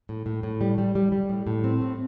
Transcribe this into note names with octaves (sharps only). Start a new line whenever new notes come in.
A2
A2
A2
G3
G3
G3
G3
A2
A2
C4
A2